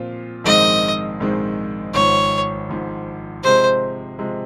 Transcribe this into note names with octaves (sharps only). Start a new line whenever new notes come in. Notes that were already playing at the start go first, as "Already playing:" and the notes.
Already playing: A#2 F3 C4 F4
A#1 G#2 D#3 G#3 C4 D#5
A#1 G#2 D#3 G#3 C4
G#1 G#2 F3 C#5
G#1 G#2 F3
C3 F3 G#3 C5
C3 F3 G#3